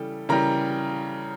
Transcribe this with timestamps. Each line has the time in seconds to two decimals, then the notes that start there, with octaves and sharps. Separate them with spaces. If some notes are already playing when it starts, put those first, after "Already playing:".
Already playing: C#3 E3 G3 A4
0.29 C#3 E3 G3 A#4 A#5